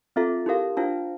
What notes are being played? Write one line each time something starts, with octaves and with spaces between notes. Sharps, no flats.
C4 F4 A4 E5
E4 G4 A#4 F5
D4 F4 C5 F5 A5